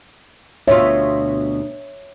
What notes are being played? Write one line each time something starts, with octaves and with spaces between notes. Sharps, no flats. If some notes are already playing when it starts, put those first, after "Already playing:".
D2 B2 F4 C#5 E5